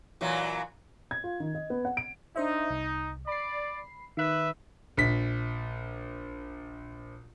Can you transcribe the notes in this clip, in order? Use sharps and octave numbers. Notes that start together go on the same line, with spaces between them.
A#2 E3 F#3
G#6
F4
D#3
D#5
B3
F#5
D7
D4 D#4 C5 E5
C2
D5 B5 C7
D#3 B4 E5 F#6
A#1 B6